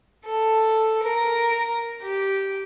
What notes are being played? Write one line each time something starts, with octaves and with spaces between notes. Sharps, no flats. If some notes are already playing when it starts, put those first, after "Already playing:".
A4
A#4
G4